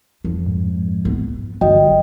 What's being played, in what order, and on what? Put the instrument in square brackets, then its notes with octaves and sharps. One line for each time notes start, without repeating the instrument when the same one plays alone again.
[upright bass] F2
[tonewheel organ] G#2
[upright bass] B3
[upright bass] G1 [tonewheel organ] F#3 [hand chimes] D#5 G5